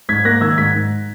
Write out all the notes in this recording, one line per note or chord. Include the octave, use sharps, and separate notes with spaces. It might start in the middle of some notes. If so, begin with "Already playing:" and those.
G#2 G#6 B6
A#3 F#6 A#6
D#3 E6 G#6
G#2 G#6 B6
G#2